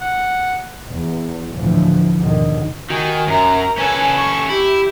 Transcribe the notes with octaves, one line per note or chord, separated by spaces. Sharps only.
F#5
E2
G#1 D2 A2 D3 E3 F3
D#2 G#2 B2 D3 D#3
D#3 F#4 G#5
F#2 A#4 A#5
C#4 A4 B4 G#5
C#6
E4 G4